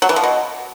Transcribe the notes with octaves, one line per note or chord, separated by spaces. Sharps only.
F#3
E3
F3
B2